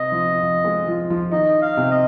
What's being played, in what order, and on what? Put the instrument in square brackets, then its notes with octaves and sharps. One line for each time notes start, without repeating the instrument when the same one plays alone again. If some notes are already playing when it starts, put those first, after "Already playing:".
Already playing: [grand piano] C3 C4 [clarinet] D#5
[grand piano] F3 F4
F3 F4
G#3 G#4
F3 F4
F3 F4
[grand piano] D#3 D#4 [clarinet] D#5
[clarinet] F5
[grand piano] C3 C4
[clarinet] D#5